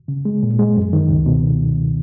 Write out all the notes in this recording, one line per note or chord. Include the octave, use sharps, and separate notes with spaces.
C#3
G#3
A#2
G#3
F#2
D#3
C#2
B2